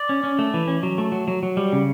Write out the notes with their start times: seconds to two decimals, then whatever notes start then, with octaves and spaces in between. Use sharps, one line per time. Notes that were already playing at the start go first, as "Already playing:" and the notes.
Already playing: D5
0.09 C#4
0.24 C#4
0.39 A3
0.54 E3
0.67 C#4
0.83 F#3
0.98 A3
1.12 F#3
1.28 F#3
1.43 F#3
1.57 G3
1.72 C#3